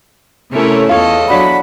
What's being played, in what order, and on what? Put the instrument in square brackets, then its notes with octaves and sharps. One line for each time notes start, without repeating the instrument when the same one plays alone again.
[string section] C3 A3 C#4 [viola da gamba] E4 A#4 C#5
[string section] E2 [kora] F4 C#5 [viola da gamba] A4 D#5
[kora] F#3 D4 [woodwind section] F#4 F#5 B5